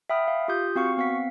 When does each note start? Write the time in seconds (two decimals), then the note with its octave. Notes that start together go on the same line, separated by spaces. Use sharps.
0.10 E5 F#5 G5 B5 D#6 F6
0.28 F5
0.48 F4 G4 D#6 G6
0.75 C4 F#4 F5 C#6 F6 C#7
0.97 B3 C4 F5 F#5 B6